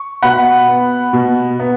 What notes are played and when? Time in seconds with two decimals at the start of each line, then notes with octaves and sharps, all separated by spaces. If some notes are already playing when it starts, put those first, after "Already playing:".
Already playing: C#6
0.23 B2 F#5 B5
0.68 B3
1.13 B2
1.60 B3